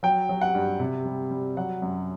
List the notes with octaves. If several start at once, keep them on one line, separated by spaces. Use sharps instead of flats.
F#3 G5
F#3
F#5
G2
C3
G3
G3
F#3 F#5
F#2